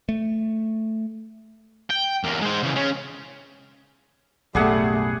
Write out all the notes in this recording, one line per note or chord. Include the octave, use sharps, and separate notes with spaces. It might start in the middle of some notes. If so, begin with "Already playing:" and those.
A3
G5
E2 A#3
G#3 C5
C#3 E3
C#4 G#4
B1 F#2 A2 G3 A3 G#4 F#5